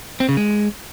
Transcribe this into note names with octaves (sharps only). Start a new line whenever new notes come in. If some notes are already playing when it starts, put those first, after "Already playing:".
C4
C#3
G#3